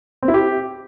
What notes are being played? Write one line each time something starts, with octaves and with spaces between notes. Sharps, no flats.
C4
E4
G4